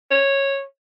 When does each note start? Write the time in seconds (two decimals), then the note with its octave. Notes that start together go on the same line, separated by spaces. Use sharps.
0.11 C#5